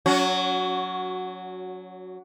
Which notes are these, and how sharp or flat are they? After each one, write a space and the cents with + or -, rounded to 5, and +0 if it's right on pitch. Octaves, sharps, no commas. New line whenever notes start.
F#3 -10 C#4 +30 F#4 +0